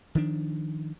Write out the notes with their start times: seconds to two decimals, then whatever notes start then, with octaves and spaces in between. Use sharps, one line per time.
0.15 D#3 F3 D4